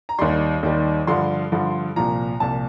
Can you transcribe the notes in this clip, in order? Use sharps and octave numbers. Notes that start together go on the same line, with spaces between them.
A#5
D#2 D#3 G3 C6
D#2 D#3 G3
G2 D3 F3 C6
G2 D3 F3
C2 A#2 F3 A#5
C2 A#2 F3 A5